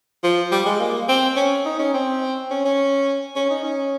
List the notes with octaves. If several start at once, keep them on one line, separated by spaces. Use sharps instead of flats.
F3
G3
G#3
A#3
C4
C#4
D#4
C#4
C4
C#4
C#4
C#4
D#4
C#4